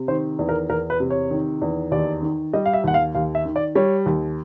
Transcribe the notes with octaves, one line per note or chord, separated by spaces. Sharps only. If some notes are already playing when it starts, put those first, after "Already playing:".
Already playing: C3
D#3 C5
E2
A#4
E2 A#4
B4
C3
C#5
D#3
E2
D#2 D5
D#3
G3 D#5
F5
E5
D#2 F#5
F5
D#2 F5
E5
D#3
D5
G3 C#5
D#2